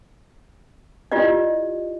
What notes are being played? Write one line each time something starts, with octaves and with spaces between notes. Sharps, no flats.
E4 F4 G4 D5 D#5